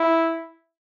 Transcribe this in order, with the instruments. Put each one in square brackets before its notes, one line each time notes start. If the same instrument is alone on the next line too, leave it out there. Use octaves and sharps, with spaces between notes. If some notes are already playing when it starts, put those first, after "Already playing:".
Already playing: [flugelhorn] E4